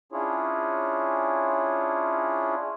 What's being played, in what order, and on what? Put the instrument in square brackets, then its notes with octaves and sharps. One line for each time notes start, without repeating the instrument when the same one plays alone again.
[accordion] C#4 D4 E4 F4 G#4 C#5